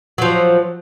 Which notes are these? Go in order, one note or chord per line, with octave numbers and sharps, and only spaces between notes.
F3 F#3